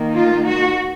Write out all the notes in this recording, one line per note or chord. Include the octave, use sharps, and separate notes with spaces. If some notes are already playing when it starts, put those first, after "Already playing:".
Already playing: D#3 A#3 D#4
F4
F#4